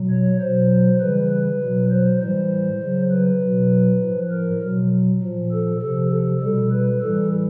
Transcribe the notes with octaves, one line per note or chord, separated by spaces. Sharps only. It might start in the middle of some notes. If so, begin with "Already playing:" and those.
Already playing: B2 F#3
C#5
B2 F#3 C5
C#3 E3 G3 B4
B4
B2 F#3
C5
A2 E3 G3 C5
C#3 F#3
B4
B2 F#3
A2 F3
A#4
B2 F#3
A#2 F3
A4
C3 F3 A4
A4
B2 G3 A4
B4
A2 E3 G3 A4